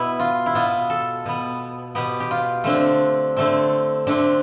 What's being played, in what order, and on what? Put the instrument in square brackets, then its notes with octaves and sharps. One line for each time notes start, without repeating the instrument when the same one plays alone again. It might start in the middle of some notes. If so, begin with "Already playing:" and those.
Already playing: [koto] B2 B3 E4
F4
E4
B2 B3 F4
A4
B2 B3
B2 B3 G4
G4
F4
D3 A3 C4 D4
D3 A3 C4
D3 A3 C4 D4